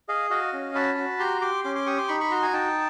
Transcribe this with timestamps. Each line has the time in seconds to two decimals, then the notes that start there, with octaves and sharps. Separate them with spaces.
0.09 G#4 D#5 F5
0.30 F#4 D#5 F5
0.53 C#4
0.75 F#4 A5 B5
0.98 F#4
1.19 G4 A#5 C6
1.41 G4 C6 D6
1.64 C#4 C6 D6
1.75 C6 D6
1.86 G4 C#6 D#6
1.98 C6 D6
2.08 D#4 B5 C#6
2.21 B5 C#6
2.31 F#4 A#5 C6
2.42 G#5 A#5
2.53 D#4 G5 A5